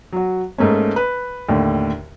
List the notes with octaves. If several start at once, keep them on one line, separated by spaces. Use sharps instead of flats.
F#3 F#4
G#2 A3 A#3 C#4
B4
D#2 A2 D3